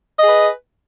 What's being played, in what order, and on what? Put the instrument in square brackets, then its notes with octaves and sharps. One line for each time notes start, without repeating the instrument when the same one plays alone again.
[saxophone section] D#5
G#4
B4